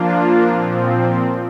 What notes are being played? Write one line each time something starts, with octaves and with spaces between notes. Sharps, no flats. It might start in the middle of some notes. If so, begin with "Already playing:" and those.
Already playing: F3 A#3 D4 F4
A#2 F3 C4